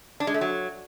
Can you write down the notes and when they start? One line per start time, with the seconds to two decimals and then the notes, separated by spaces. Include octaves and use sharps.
0.20 D4
0.27 G#3
0.34 A3
0.41 F#3